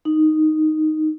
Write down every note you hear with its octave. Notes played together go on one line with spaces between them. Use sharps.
D#4